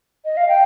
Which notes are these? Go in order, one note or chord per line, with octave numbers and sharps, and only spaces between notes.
D#5
F5
G5